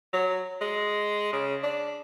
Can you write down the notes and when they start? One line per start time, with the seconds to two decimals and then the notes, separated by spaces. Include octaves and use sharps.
0.13 F#3
0.61 G#3
1.33 C#3
1.63 D4